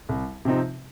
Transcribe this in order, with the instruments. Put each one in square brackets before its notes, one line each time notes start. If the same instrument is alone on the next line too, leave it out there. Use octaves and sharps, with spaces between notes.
[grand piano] C2
C3 F3 C4 D#4